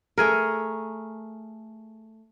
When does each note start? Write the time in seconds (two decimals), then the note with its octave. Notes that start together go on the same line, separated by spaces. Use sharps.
0.18 A3 G#4 A#4